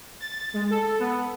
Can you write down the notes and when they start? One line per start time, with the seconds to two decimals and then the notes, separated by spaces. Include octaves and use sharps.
0.20 A6
0.54 G#3
0.70 A4
1.00 B3